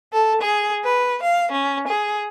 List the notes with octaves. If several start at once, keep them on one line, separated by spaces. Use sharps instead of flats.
A4
G#4
B4
F5
C#4
G#4